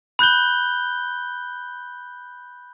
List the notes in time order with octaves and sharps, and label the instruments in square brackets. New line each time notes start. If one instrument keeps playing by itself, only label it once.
[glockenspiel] B5 F#6 G6 G7